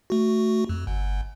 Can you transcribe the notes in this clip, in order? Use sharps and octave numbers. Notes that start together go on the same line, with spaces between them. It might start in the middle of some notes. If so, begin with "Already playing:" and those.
A3 F#4
F2
G1